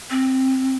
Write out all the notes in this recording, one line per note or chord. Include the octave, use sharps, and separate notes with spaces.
C4